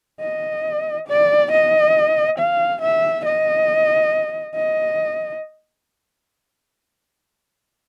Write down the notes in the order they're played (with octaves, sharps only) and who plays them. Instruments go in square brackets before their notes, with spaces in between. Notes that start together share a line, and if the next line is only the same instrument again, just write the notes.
[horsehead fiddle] D#5
D5
D#5
F5
E5
D#5
D#5